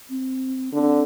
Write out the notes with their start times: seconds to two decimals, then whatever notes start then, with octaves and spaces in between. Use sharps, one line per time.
0.10 C4
0.73 D3 D4
0.78 C4